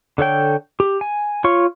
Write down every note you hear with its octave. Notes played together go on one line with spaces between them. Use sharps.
D3 A4 C#5 G5
G4
G#5
F4 C#5 C#6